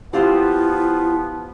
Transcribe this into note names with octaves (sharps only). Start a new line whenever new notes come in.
F3 B3 C4 E4 F4 G4 C5